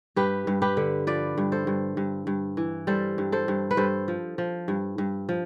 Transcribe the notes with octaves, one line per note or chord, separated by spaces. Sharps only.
G2 G4 B4
G2
G4 B4
D3
F3 B4 D5
G2
A4 C5
G2
G2
G2
E3
G3 A4 C5
G2
A4 C5
G2
B4
G2 A4 C5
F3
F3
G2
G2
F3